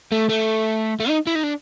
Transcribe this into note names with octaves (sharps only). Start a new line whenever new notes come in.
A3
A3
A3
D#4
E4
D#4
D4